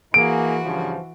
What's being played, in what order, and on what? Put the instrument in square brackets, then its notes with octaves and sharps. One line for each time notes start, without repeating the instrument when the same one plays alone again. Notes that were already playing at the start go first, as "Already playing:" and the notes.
[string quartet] E3 F#4 [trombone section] A#3 G#4 [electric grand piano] D7
[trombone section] G2 C#3 F3